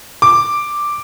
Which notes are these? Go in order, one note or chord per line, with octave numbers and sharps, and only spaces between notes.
D6